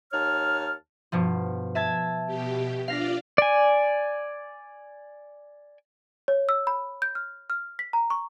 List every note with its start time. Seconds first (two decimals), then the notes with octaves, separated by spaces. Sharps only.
0.13 D#2 D#4 C#5 A5 F6
1.12 G2 B2 F3
1.75 E5 A5 G#6
2.26 B2 G4
2.88 D4 F4 D5 F5 A#6 B6
3.38 D5 G#5
6.28 C#5
6.49 E6
6.67 B5
7.02 G6
7.15 F6
7.50 F6
7.79 B6
7.93 A#5
8.10 C#6